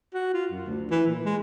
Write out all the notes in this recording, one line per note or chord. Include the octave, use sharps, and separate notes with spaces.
F#4
F4
F#2
D2
E3
A#2
G#3